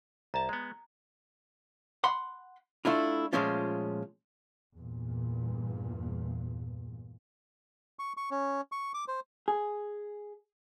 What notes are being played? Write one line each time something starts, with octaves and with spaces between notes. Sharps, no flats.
C2 A5 A#5
G#3 B3
F#5 B5 C6
A3 D4 E4 F4
A#2 F3 G#3 A3 C#4 F4
E2 G2 A#2
C#6
C#6
C#4
C#6
D6
C5
G#4